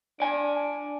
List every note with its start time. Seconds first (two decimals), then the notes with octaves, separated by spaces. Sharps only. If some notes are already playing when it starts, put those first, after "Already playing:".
0.20 D4 D5 G#5